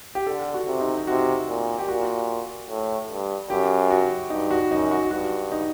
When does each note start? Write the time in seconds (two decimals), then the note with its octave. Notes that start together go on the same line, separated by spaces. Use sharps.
0.15 G4
0.27 D3 A4
0.54 F#4
0.67 C3
0.81 D#4
0.97 D#4
1.07 C3 F#4
1.48 A#2
1.79 G4
1.88 A#2 F#4
2.69 A2
3.10 G2
3.50 F#2 G4
3.90 F#4
4.30 G2 D#4
4.51 F#4
4.71 F#2 D#4
4.91 F#4
5.11 G2 F#4
5.52 D#4